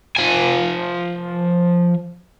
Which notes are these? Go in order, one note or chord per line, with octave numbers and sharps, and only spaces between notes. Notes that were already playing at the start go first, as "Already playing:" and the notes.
F3 G#5